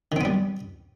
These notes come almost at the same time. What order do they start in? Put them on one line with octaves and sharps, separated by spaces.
D#3 C4 B3 G3